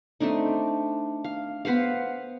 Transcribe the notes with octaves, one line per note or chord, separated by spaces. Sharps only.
A3 C4 D4 D#4
F5
B3 B4 C5 F5